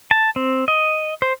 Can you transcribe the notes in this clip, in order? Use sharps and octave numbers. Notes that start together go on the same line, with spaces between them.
A5
C4
D#5
C5